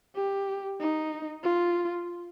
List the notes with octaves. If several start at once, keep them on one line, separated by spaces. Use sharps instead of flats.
G4
D#4
F4